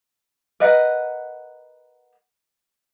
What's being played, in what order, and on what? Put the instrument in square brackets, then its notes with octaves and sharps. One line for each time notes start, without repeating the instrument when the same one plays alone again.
[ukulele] A#4 B4 D#5 F#5